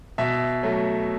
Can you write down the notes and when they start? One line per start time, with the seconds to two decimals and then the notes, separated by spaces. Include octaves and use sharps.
0.18 B2 E5
0.63 F#3 A3